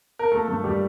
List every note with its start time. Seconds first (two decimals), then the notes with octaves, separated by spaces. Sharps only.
0.19 A#4
0.32 A3 A#3 A4
0.48 G2 A3 A4
0.64 G3 G4